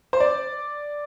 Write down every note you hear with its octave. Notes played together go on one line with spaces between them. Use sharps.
C5
D5